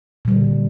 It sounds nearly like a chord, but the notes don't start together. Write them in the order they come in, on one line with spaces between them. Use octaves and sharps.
A#2 G3 D3